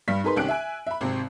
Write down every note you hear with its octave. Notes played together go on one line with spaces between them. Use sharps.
G2 G3 B6
D#4 G#4 A#4 B4 C6
C2 D#3 C#4 G4 F#6 D7
E5 G#5
E5 B5
G#1 C3 C4